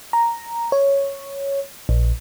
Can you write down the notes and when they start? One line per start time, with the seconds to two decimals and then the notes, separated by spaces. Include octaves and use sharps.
0.13 A#5
0.72 C#5
1.89 A#1